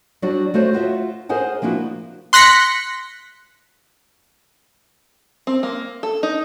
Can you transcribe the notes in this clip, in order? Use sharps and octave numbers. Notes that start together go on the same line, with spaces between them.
F#3 G3 D4 F#4 D5
A3 F#4 C5 C#5
F4 F#4 D#5 E5
G#4 A#4 C5 D#5 F#5 G#5
F3 A#3 D4 E4 F#4
C6 F#6 A#6 B6 C#7
C4
A#3
A4
D#4